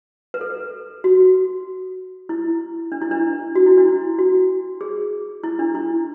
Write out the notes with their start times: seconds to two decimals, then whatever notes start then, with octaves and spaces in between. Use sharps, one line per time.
0.34 B4
0.41 A4
1.04 F#4
2.29 E4
2.92 D4
3.01 E4
3.11 D4
3.55 F#4
3.66 E4
3.78 D4
3.88 E4
4.18 F#4
4.81 G#4
5.44 E4
5.59 D4
5.75 E4